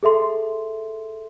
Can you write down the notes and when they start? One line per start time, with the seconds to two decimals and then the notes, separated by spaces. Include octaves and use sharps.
0.03 G#4 A4 E5 C6